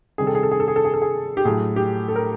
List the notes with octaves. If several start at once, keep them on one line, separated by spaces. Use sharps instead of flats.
C3 D#3 G3 G#4
A4
G#4
A4
G#4
A4
G#4
A4
G#4
A4
G#4
G4
A2 F#3 G#4
G4
A4
A#4